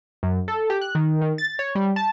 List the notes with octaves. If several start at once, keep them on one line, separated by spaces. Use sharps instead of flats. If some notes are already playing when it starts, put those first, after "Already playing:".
F#2
A4
G4
F#6
D#3
D#3
A6
C#5
G3
A5